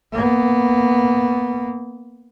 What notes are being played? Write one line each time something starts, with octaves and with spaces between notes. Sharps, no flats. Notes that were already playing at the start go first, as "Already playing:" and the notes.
A#3 B3